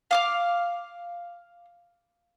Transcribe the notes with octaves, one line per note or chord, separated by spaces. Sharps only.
F5 D6 F6